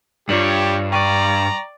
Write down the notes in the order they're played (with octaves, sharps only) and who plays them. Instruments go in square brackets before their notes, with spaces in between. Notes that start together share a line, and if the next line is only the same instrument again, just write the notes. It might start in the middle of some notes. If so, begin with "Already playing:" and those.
[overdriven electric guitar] G2 [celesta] F4 D5 F#7 [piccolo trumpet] G4 [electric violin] C#5
[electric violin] D5 [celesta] G5 C#6 D#7 [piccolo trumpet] A#5